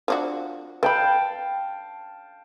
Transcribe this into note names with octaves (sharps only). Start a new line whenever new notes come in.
F3 D4 F#4
B4 F5 G5 A5 B5